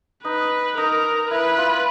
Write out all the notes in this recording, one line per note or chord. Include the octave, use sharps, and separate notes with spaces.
D#4 B4
D#4 A#4
E4 B4
F4